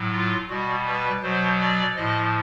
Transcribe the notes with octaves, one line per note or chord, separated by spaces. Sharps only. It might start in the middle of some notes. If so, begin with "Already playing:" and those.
Already playing: A2 F#3
F4
B2 G3 F#4
B4
B2 F#3 C5
D5
A2 F3 D#5